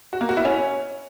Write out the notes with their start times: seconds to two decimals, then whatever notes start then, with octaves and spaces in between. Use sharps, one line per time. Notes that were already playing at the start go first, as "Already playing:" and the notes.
0.13 F#4
0.21 A#3
0.29 F#4
0.37 E4
0.45 C#4